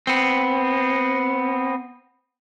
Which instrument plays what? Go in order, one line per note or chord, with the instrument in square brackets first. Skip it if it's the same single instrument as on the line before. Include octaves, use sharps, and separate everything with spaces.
[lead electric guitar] B3 C4